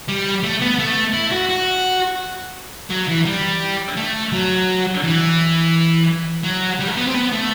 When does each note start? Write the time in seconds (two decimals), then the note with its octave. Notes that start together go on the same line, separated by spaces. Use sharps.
0.08 G3
0.43 A3
0.61 B3
0.79 A3
1.14 E4
1.31 F#4
1.50 F#4
2.90 F#3
3.08 E3
3.26 G3
3.97 A3
4.32 F#3
5.03 E3
6.44 F#3
6.80 G3
6.88 A3
6.97 B3
7.07 C4
7.14 B3
7.32 A3